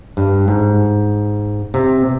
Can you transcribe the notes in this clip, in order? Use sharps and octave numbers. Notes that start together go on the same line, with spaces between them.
G2
G#2
C3